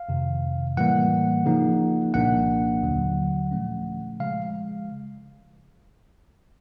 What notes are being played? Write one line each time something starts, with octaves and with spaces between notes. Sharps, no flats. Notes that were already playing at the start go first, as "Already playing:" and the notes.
Already playing: F5
F2 C3 D#3
A2 E3 G3 A#3 F#5
C#3 F3 A#3 D#4
C2 A#2 F3 A#3 D4 F#5
D#2 D3 F#3
A#2 F3 A3 C#4
C#3 F3 G#3 F5